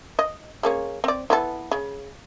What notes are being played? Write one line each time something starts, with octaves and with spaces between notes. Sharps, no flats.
D#5
G#3 A#3 C#4
C4 D5
E3 B3 A4
C#3